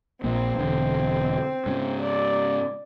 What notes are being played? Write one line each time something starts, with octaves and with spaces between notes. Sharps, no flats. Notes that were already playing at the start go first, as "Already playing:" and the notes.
A#1 A#3 C4
E1 D3
G#2 C#3
D5